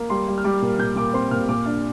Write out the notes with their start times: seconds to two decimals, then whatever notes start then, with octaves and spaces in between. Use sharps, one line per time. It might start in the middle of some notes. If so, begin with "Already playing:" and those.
Already playing: A#3
0.10 G3 C6
0.28 G3
0.38 F6
0.44 G3 D6
0.62 A#2
0.79 A#2 G6
0.96 A#2 D6
1.14 C4 C6
1.31 A#2 F6
1.49 A#2 D6
1.66 D4